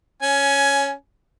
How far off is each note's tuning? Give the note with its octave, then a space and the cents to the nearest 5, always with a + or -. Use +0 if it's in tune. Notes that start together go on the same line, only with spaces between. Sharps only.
C#4 +0 G#5 +15